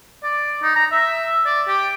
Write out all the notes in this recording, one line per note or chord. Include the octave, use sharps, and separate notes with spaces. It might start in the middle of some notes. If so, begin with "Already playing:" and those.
D5
D#4
A#5
E5
D5
G4